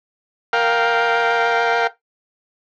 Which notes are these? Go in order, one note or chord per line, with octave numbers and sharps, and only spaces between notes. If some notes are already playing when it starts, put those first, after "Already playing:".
A#4 F5 G5